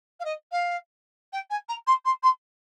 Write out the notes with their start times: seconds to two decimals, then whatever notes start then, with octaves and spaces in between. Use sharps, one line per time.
0.20 F5
0.24 D#5
0.51 F5
1.32 G5
1.50 G#5
1.68 A#5
1.87 C6
2.05 C6
2.23 C6